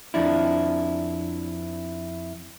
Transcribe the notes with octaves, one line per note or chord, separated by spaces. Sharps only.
F2 D4 E4